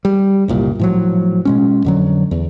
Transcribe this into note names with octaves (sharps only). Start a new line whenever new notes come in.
G3
F#1 C2 A#2
A2 F3 F#3
B2 G#3 C#4
F2 D3 F#3
E2